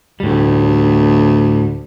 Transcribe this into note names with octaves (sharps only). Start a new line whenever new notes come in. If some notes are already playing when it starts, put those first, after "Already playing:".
D2 A2 G3